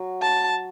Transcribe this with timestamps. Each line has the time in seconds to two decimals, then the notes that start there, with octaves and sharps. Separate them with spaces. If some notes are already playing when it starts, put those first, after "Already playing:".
Already playing: F#3
0.22 A5